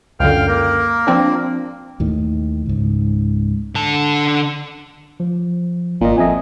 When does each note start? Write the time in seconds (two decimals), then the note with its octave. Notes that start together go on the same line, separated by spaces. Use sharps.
0.20 C#2 F#2 D3 F5 G5 F6
0.47 A#3 A#4
1.07 F3 C4 D4
2.00 D#2 A2 D#3
2.66 C#2 G#2
3.75 D3 A5
5.20 F3
6.01 G#1 A#2 D#5
6.18 F2 D#5 E5 G#5